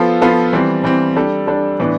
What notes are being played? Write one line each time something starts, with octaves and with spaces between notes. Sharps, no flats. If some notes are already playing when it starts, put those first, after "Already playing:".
Already playing: F3 B3 F4 A4
F3 B3 F4 A4
E3 G3 C4
E3 G3 C4
G3 D4 A4
G3 D4 A4
A2 E3 B3 D4